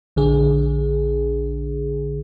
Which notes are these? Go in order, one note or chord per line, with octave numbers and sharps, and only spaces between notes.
A#1 D3 G#4